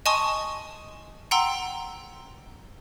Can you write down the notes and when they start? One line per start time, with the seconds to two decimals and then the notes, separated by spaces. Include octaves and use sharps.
0.06 D#5 G#5 A5 C6 C#6 D#6
1.31 F#5 G5 A#5 C6 E6